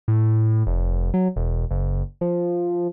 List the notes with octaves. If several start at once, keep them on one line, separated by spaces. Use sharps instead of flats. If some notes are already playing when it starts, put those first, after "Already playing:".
A2
F1
F#3
E1
F#1
F3